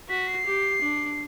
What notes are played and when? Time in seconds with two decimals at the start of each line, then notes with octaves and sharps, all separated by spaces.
0.09 F#4 B6
0.28 C7
0.46 G4
0.82 D4